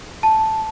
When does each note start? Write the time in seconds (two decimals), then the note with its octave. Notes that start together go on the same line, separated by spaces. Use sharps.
0.23 A5